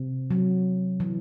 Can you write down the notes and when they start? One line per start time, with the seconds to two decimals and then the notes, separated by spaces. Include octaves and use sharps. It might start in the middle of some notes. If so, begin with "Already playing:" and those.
Already playing: C3 C4
0.31 F#3
1.00 E3